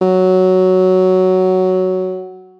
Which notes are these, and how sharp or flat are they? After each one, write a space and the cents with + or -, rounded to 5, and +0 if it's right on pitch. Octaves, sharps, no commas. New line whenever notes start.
F#3 +5